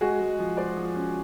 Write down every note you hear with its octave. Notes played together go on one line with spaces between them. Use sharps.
G#3 F#4 G#4
G#3
F3
G#3 C5 D5
F3
C#4